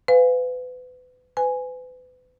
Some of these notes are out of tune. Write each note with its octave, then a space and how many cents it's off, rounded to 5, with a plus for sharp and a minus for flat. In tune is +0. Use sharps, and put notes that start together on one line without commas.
B4 +30 F5 +5 G#5 -20
B4 +35 G#5 +0